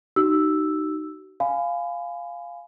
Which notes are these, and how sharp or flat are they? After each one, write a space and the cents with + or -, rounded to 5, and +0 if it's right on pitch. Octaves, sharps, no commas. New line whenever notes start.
D#4 -15 F#4 +45 E6 +0
F5 +0 G#5 +0 B5 +30